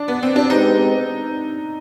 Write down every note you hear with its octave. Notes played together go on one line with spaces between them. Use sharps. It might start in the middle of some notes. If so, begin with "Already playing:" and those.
Already playing: D4
B3
C4
D4
G#3 C4 D#4 G4 B4